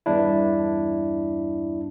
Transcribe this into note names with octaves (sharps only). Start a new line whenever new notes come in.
E2 G2 D4 E4